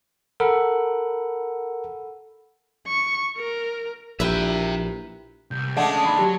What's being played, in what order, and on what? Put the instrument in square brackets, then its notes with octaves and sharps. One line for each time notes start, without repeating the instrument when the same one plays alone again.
[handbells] A4 F#5 B5 [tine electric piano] A#4
[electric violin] C#6
A#4
[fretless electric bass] A#1 [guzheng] E4 A#4 B4 [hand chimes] G4 [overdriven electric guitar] E5 G5
[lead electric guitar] C2 [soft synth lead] G6
[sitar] G#3 A3 D4 [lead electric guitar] C#4 F5 [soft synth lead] F#5
[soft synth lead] D#6
[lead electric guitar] D#2 D#3 [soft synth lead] B5
[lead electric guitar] F#3 [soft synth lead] G4